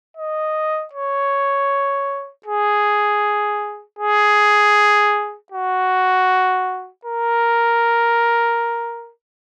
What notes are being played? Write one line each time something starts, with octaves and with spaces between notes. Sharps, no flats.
D#5
C#5
G#4
G#4
F#4
A#4